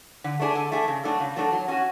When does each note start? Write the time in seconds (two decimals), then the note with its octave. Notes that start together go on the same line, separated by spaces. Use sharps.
0.24 D3
0.40 A3 D4 G#4
0.55 D3
0.72 A3 D4 G#4
0.88 C#3
1.04 F#3 A3 D4 A4
1.20 C#3
1.36 F#3 A3 D4 A4
1.53 F#3
1.68 C#4 F#4